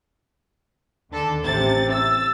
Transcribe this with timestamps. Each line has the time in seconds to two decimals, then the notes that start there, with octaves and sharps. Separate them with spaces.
1.10 D#2 D3 A4
1.40 A1 C3 A6
1.91 E6 A6